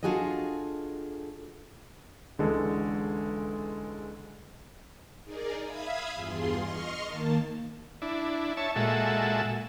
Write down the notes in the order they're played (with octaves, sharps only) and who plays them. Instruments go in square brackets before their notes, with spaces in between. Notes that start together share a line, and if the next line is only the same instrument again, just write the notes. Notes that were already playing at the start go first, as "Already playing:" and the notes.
[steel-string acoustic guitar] D4 F4 F#4 G#4 A4 D#5
[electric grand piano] C#2 D3 E3 G#3 A4
[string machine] D#4 G#4 A#4 D5
E5 F5 B5 D#6 G#6
E2 G2 F4 G#4 C6
D#5 C6 C#6 F6
D#3 A#3 A5
[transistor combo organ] D4 E4
C#5 E5 A5
A#2 G#3 F#4 A4 E5